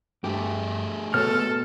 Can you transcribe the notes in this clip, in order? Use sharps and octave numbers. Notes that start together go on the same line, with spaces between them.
G2 A3 G4 G#4
B2 B3 A4 C#5 F6